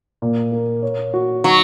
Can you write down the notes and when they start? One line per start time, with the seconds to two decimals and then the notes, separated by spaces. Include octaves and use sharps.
0.22 A#2
0.52 A#3
0.83 C#5
1.14 F#4
1.44 F#3 D#4